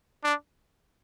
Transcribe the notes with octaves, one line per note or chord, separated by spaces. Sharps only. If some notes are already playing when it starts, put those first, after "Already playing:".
D4